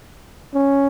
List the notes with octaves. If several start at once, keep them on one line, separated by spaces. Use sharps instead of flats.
C#4